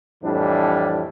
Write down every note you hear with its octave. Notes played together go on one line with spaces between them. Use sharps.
F2 A2 E3 G3 D4